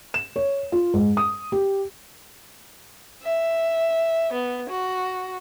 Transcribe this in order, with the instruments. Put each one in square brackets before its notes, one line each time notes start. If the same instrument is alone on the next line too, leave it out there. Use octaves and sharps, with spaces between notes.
[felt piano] E7
C#5
F4
G#2
D#6
G4
[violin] E5
B3
F#4